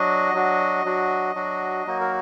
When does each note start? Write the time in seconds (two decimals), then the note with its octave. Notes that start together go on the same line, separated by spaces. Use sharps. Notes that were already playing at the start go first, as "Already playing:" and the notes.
Already playing: F#3 D4 F#4 D#5
0.34 F#3 D4 F#4
0.85 F#3 D4 F#4
1.35 F#3 D4 F#4
1.86 F#3 A#3 D#4 F#4
2.01 A#4